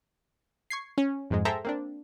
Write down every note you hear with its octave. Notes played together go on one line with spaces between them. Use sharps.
C#6 G#6 C7
C#4
F2 G#2 G#3
G#4 A4 C5 E5 G5 A#5
A#3 C4 D4